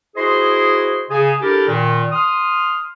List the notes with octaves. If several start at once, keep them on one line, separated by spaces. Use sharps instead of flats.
E4 F#4 G#4 C5 D#5 C6
C#3 G#4 G#5
D4 E4 G4 A4 A#4
A#2 D#3
C6 D#6 F6